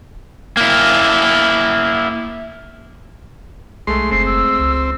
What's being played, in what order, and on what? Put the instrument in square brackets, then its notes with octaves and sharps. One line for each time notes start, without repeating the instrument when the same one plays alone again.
[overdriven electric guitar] A#3 E4
[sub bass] B1 [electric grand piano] G#3 A3 A4 [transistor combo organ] C6
[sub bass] F#1 [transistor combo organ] C4 [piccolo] C7
[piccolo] E6
[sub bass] C#2